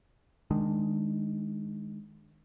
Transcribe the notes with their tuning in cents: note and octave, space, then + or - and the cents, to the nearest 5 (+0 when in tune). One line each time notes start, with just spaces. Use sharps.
D#3 +0 G#3 +0 D4 +15